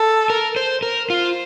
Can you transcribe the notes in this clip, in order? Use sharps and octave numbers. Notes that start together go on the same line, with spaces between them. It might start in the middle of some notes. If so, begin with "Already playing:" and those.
Already playing: A4
A#4
C5
A#4
F4 C5